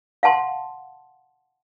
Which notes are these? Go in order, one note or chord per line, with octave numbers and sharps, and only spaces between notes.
F5 F#5 A5 C6